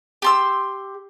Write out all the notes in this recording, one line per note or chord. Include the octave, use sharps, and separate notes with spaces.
G4 C6 E6